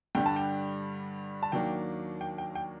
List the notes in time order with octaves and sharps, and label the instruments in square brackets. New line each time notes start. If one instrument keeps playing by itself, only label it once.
[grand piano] G2 D3 G3 D4 G5
A5
G5
A5
D#2 D#3 F#3 A#3 D4 G5
G5
G5
G5